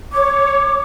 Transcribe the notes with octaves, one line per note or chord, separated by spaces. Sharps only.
C#5 D6